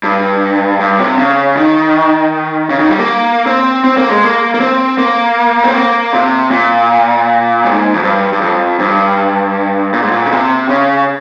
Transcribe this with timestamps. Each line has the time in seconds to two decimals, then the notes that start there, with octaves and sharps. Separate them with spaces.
0.04 G2
0.80 G2
0.99 C3
1.18 C#3
1.57 D#3
2.70 C#3
2.79 D#3
2.89 G3
2.98 A#3
3.47 C4
3.84 C4
3.97 A#3
4.10 G#3
4.23 A#3
4.54 A#3
4.60 C4
4.98 A#3
5.64 C4
5.74 A#3
6.13 C3
6.51 A#2
7.65 G#2
7.95 F2
8.03 G2
8.33 G2
8.41 F2
8.79 G2
9.93 A#2
10.02 G#2
10.12 A#2
10.26 C#3
10.31 C3
10.69 C#3